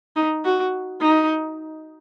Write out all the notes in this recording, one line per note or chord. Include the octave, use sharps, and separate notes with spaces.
D#4
F#4
D#4